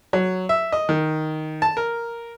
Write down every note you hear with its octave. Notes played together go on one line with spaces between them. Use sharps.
F#3
E5
D#5
D#3
A5
A#4